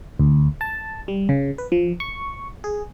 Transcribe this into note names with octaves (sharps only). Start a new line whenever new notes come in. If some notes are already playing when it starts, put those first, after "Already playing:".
D2
A5
G3
C#3
B4
F3
C#6
G#4